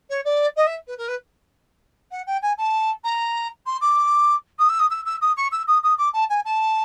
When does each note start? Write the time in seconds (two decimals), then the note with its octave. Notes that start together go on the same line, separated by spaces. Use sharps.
0.09 C#5
0.24 D5
0.56 D#5
0.66 E5
0.87 B4
0.97 A#4
1.08 B4
2.11 F#5
2.26 G5
2.42 G#5
2.57 A5
3.04 A#5
3.66 C6
3.80 D6
4.58 D#6
4.69 E6
4.79 D#6
4.90 E6
5.05 E6
5.21 D#6
5.36 C#6
5.51 E6
5.67 D#6
5.83 D#6
5.98 D6
6.13 A5
6.29 G#5
6.45 A5